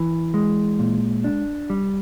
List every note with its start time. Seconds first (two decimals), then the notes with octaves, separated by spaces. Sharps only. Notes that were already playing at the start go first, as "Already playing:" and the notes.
Already playing: E3
0.34 G#3
0.79 A#2
1.24 D4
1.70 G3